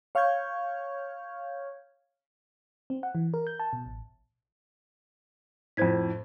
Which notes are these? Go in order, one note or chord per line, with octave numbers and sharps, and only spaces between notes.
C#5 F5 C#6 F6 G6 G#6
C4
F#5
E3
A#4
G6
A5
B2
A1
F2 A2 C5 G#6 B6